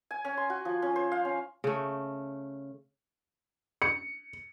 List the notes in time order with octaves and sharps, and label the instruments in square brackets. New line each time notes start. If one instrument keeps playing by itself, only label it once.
[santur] G#5
C#4
C6
F#4
F3
C#4
C5
F5
C#4
[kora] C#3 A3
[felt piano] C#7